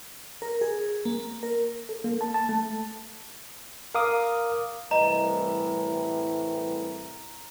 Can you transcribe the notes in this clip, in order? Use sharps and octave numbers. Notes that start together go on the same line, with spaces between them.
A#4
G#4
A#3
A#4
A4
A#3
A5
A5
A3
A#4 F5 D6 D#6
C2 A2 E3 D#5 A#5